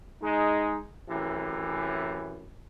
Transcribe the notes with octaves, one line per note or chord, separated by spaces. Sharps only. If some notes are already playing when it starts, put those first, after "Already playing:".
G#3 D#4
F#2 A2 C3 E3